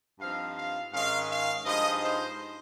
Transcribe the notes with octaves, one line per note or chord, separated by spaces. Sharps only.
G2 F3 C4 D#4 F5
F5
G#2 D#3 G#3 C#4 F5
F5
G2 F3 G#3 D#4 D#5
C5